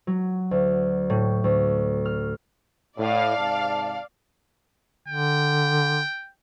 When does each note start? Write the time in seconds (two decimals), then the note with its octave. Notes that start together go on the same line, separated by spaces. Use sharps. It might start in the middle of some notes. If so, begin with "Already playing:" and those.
0.07 F#3
0.51 D2
1.10 A2
1.44 D2
2.05 F6
2.98 A2 D5 F5
3.38 G#2 C3 A5
5.08 D3 G5